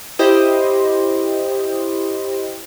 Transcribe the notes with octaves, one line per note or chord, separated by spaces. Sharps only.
E4 G4 C5 D#5